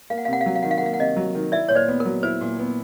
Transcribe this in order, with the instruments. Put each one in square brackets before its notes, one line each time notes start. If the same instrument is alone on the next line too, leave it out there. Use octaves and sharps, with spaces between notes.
[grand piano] A#3 [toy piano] F5
[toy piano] F#5
F5
[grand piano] C3 [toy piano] F#5
[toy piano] F5
[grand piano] F#3 [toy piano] F#5
[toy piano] F5
[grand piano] D#3 [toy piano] F#5
[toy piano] F5
F#5
[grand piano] A#3 [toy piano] F5
[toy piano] F#5
[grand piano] C3 [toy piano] D#5 F5
[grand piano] F#3
D#3
[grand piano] E4 [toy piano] D5 E5
[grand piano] A#2 [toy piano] C#5
[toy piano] C5 D5
[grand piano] B3
[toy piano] A#4
[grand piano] F#3
[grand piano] E4 [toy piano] C5
[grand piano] A#2
B3